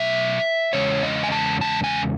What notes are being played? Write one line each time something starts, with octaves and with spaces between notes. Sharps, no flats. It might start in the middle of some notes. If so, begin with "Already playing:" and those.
Already playing: B2 F#3 A3 D#4 E5
E2 C#3 G#3 C#4 C#5
D#5
G#5
A5
A5
G#5